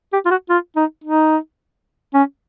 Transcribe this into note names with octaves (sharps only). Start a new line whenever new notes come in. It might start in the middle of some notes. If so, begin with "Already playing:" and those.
G4
F4
F#4
F4
D#4
D#4
C#4